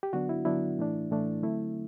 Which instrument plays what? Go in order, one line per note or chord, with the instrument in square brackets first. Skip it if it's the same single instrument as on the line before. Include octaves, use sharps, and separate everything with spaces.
[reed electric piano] G4
D3 F#3 B3 D4 F#4
E4
D3 F#3 B3 D4 E4
A2 E3 A3 D4
A2 E3 A3 D4
D3 F#3 A3 C4 E4